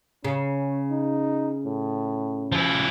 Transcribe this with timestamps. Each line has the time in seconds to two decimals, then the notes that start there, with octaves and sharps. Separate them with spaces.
0.24 C#3 C#4
0.91 D#4
1.65 A2
2.52 F3 E4